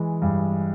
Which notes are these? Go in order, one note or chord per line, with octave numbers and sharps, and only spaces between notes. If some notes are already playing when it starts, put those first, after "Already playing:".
Already playing: E3 G#3
G2